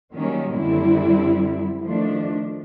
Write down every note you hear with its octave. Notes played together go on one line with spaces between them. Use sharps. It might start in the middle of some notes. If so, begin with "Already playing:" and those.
D#3 F#3 G3 A#3 C#4
F#2 D3 G3 C4 E4
D#3 F3 A3 D4